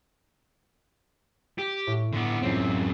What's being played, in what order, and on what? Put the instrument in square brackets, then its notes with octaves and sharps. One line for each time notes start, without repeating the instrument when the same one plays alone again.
[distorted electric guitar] G4
[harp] A2
[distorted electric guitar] D3 B3
[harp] C#2 C#4 [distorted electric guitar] F#2 C4